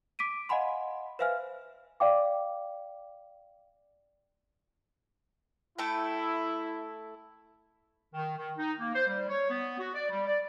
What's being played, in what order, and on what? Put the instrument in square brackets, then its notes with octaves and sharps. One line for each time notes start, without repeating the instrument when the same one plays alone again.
[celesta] D6 B6 D7 D#7
D#5 F5 F#5 G#5 B5 C6
B4 C5 E5 F5 G#5 F6
D5 F5 G5 D6
[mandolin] A3 A4 G5 [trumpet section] E4
[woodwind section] D#3
D#3
D#4
A#3
C5
G3
C#5
B3
F#4
D5
G3
D5